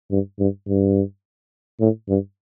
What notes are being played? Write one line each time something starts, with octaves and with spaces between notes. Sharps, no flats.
G2
G2
G2
A2
G2